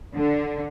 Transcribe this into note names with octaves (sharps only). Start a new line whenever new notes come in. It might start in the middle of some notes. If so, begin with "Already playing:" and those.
D3